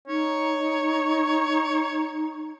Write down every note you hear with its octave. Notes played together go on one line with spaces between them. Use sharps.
D#4 C#5